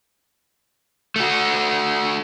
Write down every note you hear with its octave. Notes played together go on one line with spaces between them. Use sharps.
A3 F#4